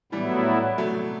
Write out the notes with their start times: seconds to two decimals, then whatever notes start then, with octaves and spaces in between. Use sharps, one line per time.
0.12 A2 E3 F#3 G3 B3 E4
0.78 F#3 A3